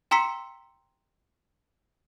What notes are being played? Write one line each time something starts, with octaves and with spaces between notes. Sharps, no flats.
G5 A#5 C6 E6 B6 C#7